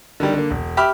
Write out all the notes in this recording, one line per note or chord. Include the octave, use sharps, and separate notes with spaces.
D3 D#3 G3
D3 A#3
E1
G4 E5 B5 D6 F6